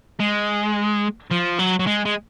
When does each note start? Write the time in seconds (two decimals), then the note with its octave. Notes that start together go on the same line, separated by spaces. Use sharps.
0.20 G#3
1.31 F3
1.59 F#3
1.79 F#3
1.87 G#3
2.05 G#3